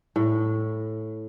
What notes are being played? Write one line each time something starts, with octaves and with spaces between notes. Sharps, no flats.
A2